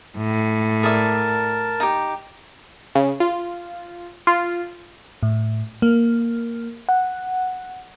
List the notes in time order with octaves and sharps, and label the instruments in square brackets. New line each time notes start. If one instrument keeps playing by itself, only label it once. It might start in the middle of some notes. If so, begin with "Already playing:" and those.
[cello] A2
[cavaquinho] G#4 D5 E5 [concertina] A#4 A5
[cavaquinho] D#4 G4
[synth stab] C#3
F4
F4
[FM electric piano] A2
A#3
F#5